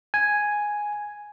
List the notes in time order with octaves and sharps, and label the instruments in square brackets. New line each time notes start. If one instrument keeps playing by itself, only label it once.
[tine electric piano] G#5